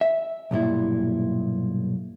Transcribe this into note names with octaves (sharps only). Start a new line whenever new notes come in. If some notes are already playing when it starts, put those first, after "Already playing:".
E5
B1 G2 A#2 E4